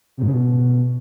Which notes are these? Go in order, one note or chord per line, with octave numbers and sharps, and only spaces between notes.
C3
G#2
C#3
B2